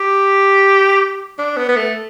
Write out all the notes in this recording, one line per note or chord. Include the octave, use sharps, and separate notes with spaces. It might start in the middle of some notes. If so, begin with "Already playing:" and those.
Already playing: G4
D4
B3
B3
A3